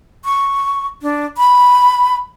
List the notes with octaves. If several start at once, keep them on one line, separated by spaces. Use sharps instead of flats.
C#6
D4
B5